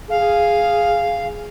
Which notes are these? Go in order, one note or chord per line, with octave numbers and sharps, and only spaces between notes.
G#4 F5